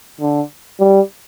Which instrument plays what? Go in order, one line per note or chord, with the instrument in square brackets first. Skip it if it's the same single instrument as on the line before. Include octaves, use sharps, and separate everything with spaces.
[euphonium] D3
G3